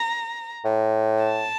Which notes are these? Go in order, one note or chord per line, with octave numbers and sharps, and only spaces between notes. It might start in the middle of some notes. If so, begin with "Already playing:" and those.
Already playing: A#5
A2
A5